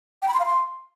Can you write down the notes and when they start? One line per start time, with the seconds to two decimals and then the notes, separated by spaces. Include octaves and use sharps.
0.22 G5
0.28 B5
0.34 C6
0.40 F5
0.45 C6